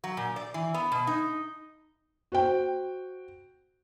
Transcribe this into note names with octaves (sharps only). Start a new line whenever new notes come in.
F#3
A#2
D5
E3
B3
B2
D#4
F#4 C5 G5